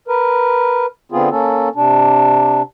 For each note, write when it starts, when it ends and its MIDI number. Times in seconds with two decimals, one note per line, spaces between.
0.08 0.86 70
0.08 0.86 71
1.12 1.29 50
1.12 1.29 59
1.12 1.29 60
1.12 1.29 65
1.12 1.29 68
1.30 1.69 58
1.30 1.69 61
1.30 1.69 69
1.75 2.62 48
1.75 2.62 62